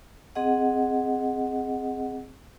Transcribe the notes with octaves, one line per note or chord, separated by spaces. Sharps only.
C4 G#4 D#5 F#5